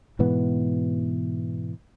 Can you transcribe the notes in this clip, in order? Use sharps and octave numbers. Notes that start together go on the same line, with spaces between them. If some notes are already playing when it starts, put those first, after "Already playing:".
G#2 B2 E3 B3